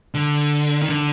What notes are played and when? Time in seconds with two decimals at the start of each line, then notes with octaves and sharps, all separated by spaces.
0.14 D3
0.82 D#3
0.90 D3